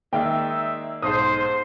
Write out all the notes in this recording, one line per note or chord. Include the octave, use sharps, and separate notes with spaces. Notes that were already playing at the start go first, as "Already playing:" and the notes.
D#3 G#3 A#3 D#4 D5 E5 G5
B1 G#2 C5 D#6